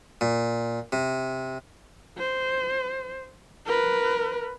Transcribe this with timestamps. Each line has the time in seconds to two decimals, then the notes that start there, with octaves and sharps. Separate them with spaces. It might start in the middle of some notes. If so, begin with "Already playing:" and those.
0.21 A#2
0.92 C3
2.18 C5
3.66 A#4 B4